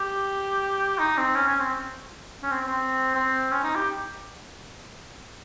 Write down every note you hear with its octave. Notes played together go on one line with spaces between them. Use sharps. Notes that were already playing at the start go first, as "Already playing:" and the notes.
Already playing: G4
D#4
C4
C#4
C#4
C4
C#4
C4
C4
C4
C#4
D#4
G4